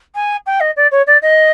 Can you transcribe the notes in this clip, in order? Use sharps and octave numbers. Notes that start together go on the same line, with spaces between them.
G#5
G5
D#5
D5
C#5
D5
D#5